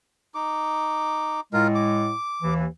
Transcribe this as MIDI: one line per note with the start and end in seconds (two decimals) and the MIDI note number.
0.35 1.40 63
0.35 1.40 86
1.53 2.12 45
1.53 2.12 56
1.53 1.67 65
1.53 1.67 70
1.75 2.54 86
2.42 2.66 39
2.42 2.66 52